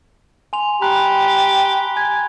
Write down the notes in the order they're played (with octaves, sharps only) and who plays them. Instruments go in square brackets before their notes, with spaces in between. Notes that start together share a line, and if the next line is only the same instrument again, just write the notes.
[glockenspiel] G#5 C6 F7
[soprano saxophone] G4 [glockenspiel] A#5 B5 F#6
[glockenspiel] G#5 G#6